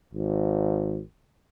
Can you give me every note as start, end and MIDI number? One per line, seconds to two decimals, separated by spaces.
0.14 1.00 32